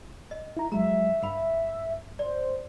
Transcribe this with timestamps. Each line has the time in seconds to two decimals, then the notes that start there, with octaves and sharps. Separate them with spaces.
0.31 D#5
0.57 E4 A#5
0.72 F2 F#3 G#3 E5 A#5
1.23 G2 F5 B5
2.19 C5 D5